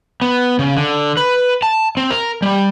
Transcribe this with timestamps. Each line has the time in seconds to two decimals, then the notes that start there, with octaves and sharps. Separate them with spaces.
0.22 B3
0.59 C#3
0.77 D3
1.17 B4
1.63 A5
1.97 C4
2.11 A#4
2.42 G3